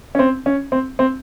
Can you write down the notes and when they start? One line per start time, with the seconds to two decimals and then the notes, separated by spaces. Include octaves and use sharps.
0.15 C#4
0.19 C4
0.46 C#4
0.72 C4
0.99 C4